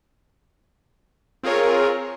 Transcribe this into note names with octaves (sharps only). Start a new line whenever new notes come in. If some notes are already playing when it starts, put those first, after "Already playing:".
C4 F4 G#4 A#4 C#5